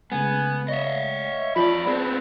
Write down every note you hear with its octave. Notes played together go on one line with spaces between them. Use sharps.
C#3 G#3 A3 B3 G#5
C#5 D#5 E5
F2 F4 D5 A5 B5
B3 C4 G#4